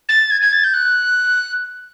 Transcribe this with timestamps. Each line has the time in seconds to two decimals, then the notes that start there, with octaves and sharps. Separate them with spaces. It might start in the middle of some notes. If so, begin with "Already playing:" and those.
0.08 A6
0.31 G#6
0.41 G#6
0.52 A6
0.64 G6
0.74 F#6